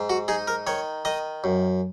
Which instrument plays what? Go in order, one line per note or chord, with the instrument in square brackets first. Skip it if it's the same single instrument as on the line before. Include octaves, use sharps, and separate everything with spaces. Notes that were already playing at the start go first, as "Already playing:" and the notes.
Already playing: [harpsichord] G#2
F#4
D#4 G#4
A#4
D#3 C#5
D#3 D#5
F#2